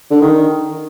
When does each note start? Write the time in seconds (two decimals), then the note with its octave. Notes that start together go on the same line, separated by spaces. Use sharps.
0.11 D3
0.22 D#3